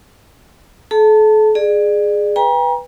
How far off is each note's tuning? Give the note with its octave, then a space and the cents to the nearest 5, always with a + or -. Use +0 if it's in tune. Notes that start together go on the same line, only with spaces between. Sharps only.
A4 -40 A5 +20
G#4 +0 D5 +30
B4 +0 G5 +35 A#5 +30